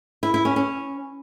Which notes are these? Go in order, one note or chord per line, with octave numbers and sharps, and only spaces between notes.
E4
E4
C#4
C#4